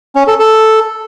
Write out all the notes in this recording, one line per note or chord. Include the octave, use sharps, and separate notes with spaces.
C#4
A4
A4